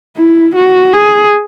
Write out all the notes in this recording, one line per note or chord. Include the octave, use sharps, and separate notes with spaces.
E4
F#4
G#4